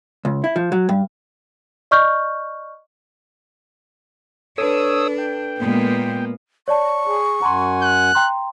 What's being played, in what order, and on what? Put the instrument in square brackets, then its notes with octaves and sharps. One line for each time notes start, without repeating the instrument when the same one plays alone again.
[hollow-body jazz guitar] C#2
E4
F3
F#3
G2
[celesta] D5 D#5 C#6 F6 G6
[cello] D4 [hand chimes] A4 B4 [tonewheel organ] C#5 D#6 E6
[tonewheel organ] G5
[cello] A#2 G#3 [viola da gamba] A#3 B3
[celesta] C#5 D5 A5 [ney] C#6
[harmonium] G#4
[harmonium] F#2 F#5 G#5 [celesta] A#5 C6
[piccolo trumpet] F#6
[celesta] G5 A#5 C6